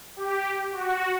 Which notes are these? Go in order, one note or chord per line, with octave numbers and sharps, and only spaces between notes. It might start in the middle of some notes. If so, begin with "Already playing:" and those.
G4
F#4